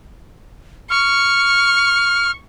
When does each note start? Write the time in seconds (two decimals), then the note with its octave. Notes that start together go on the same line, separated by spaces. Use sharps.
0.90 C#6 F6